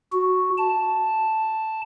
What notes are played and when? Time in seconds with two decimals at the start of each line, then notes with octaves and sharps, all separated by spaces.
0.13 F#4
0.58 A5